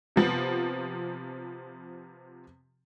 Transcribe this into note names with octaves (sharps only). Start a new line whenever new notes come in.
C3 F3 B3